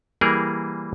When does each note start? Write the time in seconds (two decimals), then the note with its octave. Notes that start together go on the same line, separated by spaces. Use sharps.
0.21 E3 G3 A#3 G#4 A#4